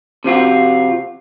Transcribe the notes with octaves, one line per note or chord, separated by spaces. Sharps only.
C3 F3 F4 F#4